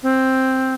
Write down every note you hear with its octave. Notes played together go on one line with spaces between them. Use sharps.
C4